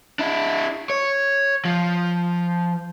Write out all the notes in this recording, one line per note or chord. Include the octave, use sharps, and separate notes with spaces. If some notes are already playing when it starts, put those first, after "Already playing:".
D4 E4
C#5
F3